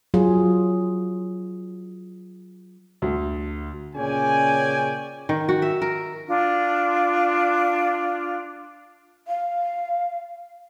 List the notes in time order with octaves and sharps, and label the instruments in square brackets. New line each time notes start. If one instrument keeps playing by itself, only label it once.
[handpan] F#3 F4 G#4
[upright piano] D2
[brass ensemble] A#2 C#3 C#4 D5 G5 G#5
[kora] D#3
F#4
E5
A#4
[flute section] D4 F4
[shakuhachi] F5